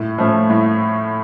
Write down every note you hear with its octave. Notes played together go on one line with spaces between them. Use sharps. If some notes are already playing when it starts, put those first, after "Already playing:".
Already playing: A2
F3 A3 C#4
A2